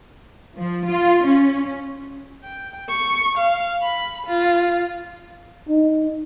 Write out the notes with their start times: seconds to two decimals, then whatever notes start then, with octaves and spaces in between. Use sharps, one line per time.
0.58 F3
0.88 F4
1.25 C#4
2.43 G5
2.90 C#6
3.38 F5
3.83 B5
4.26 F4
5.69 D#4